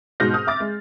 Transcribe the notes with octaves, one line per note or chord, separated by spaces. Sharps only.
G#2 B2 F6 G6 A#6
D#6 F6
E5 D6 A6
G#3